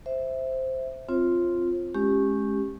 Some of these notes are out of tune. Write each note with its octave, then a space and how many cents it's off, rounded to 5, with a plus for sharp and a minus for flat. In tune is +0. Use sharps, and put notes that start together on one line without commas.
C5 +0 E5 -5
C4 +0 F4 +0 C5 +40
G#3 +20 C#4 -15 G4 +0